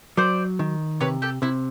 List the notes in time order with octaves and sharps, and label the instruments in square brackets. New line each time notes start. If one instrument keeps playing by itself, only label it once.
[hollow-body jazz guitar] F#3 [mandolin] C5 D5
[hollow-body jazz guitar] D#3
[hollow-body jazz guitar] C3 [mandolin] B4 C#5
[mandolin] G4 A4
[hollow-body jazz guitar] C3 [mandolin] E4